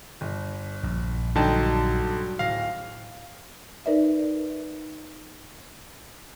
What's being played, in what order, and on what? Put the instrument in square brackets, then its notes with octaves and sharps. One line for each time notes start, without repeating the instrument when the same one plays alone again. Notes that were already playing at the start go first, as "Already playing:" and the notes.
[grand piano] G1
[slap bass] A#1
[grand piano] G2 F#3 G5 [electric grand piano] D3 D#4 A5
[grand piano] D1 A#6 [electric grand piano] F5
[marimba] D#4 A#4 B4 D5 E5